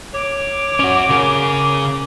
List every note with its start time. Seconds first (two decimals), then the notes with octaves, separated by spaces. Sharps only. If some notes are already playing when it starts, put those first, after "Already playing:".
0.14 C#5 D6
0.80 C#4 F#4
1.10 C#3 G#4 A#4